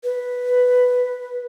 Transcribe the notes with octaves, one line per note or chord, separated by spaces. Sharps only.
B4